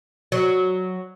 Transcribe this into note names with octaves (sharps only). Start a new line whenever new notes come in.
F#3